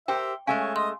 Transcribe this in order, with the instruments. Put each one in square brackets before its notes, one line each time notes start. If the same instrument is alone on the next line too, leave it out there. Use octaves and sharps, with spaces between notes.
[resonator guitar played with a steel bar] G4 A#4 C5 [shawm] E5 [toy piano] G5
[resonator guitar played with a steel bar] G#3 A3 C#4 [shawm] C#5 [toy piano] F5 G#5
[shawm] D#5 [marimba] C6